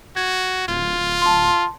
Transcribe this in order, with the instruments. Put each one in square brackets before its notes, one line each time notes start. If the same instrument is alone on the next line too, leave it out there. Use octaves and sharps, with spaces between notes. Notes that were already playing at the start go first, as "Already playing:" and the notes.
[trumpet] F#4 [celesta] G#6
[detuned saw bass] D1 [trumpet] F4
[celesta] A5 C6